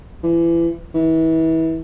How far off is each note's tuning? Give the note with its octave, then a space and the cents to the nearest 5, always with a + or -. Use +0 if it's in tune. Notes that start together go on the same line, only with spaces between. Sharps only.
E3 +30
E3 -30